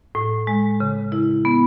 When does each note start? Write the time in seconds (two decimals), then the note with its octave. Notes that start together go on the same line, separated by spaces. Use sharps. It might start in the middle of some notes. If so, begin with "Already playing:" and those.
0.15 A2
0.47 G#3
0.80 C#3
1.12 E4
1.45 B3